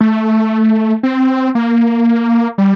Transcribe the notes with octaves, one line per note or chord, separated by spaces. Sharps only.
A3
C4
A#3
G3